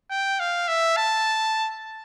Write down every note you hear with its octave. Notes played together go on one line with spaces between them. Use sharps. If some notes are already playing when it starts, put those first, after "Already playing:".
G5
F5
E5
A5